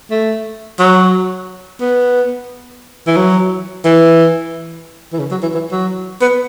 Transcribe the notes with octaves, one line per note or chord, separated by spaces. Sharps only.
A3
F#3
B3
E3
F#3
E3
E3
C#3
F#3
E3
E3
F#3
B3